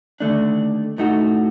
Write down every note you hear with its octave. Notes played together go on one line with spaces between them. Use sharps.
D#2 D3 A3 D4
A2 A3 D#4 F#4